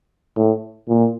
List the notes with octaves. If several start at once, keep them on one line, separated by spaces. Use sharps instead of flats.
A2
A#2